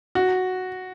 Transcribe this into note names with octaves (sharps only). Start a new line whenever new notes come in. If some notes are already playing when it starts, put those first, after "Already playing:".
F#4